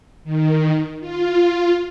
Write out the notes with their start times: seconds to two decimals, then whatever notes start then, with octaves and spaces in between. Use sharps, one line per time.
0.24 D#3
1.00 F4